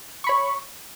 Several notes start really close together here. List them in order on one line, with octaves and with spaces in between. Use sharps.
C#6 B5 C#5